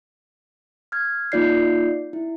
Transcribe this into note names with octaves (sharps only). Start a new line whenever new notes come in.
F6 G#6
A#3 D#4 F4 D5 G6 C7
E4